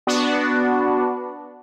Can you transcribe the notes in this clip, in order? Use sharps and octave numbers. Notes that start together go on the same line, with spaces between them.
B3 D4 F#4